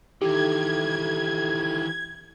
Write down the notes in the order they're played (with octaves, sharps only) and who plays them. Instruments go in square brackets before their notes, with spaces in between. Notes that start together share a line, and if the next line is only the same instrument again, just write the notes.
[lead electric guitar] D#3 E3 [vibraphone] D#4 A4 E5 [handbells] G4 [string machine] G#6